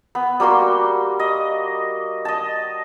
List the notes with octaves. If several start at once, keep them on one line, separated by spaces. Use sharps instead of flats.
B3
G3 A#3 F#4 C6
D#5
D#5 A5